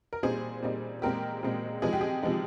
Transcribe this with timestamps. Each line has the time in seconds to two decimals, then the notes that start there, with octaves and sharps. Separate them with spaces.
0.13 A#4
0.23 A#2 G3 C4 D#4 G#4 C5
0.62 A#2 G3 C4 D#4
1.02 A#2 G#3 C4 G4 A#4
1.43 A#2 G#3 C4
1.82 C3 F3 G#3 D#4 G#4
1.93 G4
2.01 G#4
2.23 C3 F3 G#3 D#4